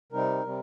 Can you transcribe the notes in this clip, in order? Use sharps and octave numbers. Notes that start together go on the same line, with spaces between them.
C3 G3 C4 D#4 A#4
C3 G3 C4